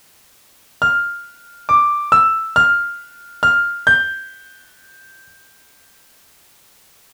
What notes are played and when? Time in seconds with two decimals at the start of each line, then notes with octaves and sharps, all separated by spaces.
0.82 F6
1.69 D6
2.12 E6
2.56 F6
3.43 F6
3.87 G6